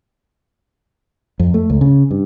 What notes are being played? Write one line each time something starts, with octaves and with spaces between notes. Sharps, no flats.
F2
A3
C#2
C#3
G2